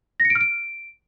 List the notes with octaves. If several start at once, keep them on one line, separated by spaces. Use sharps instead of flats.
A#6
C#7
D7
F6
D7